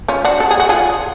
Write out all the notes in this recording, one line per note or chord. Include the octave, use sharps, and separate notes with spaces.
C#4 F4
D4 F#4
A4
G#4
F#4
F4 G#4